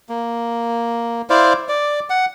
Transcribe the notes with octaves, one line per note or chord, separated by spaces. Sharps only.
A#3
E4 C5 D5 F5
D5
F#5